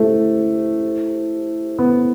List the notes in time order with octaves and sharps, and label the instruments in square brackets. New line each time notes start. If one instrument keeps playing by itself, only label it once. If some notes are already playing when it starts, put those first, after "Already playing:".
Already playing: [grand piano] A3 [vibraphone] E4 G4 C5
[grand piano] B3